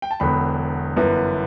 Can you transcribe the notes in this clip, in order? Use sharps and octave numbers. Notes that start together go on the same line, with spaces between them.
G5
A5
E1 E2 D3 F#3 G5 B5
G1 F#2 E3 B3